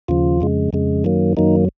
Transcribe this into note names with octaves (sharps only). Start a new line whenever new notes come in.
D#2 C#3 F3 F4
F2 C#3 G#3
F2 C#3 G#3
F#2 D#3 F#3 A#3
F#2 D#3 F#3 A#3 D#4